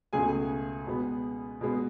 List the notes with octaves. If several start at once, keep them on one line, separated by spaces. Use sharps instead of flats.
C#2 B2 A3 G#4 G#5
B2 G#3 B3
B2 G#3 B3